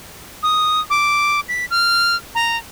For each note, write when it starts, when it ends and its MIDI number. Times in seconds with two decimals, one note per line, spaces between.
0.43 0.80 87
0.90 1.40 86
1.49 1.65 95
1.71 2.16 89
2.35 2.57 82